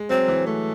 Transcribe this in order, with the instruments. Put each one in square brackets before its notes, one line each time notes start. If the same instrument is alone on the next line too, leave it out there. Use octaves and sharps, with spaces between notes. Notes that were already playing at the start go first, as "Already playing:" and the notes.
Already playing: [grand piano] G#3
[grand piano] F#3 [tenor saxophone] C4
[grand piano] E3
[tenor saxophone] A3